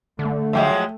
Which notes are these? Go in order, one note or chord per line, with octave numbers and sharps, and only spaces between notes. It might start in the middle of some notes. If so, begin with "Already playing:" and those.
D3 A3
F3 F#3 G#3 E5 G5